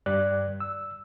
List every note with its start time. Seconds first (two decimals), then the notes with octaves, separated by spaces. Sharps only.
0.06 G2 G3 D5 F#6
0.60 E6